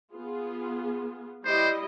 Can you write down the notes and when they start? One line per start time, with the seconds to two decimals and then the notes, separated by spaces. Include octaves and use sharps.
0.13 B3 F4 G#4
1.45 G3 E4 C5 D#5